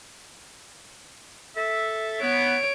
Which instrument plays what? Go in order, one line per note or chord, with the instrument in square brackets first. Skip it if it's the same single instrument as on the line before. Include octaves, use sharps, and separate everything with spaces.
[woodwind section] A4 E5
[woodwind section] B3 [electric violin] C#5 D7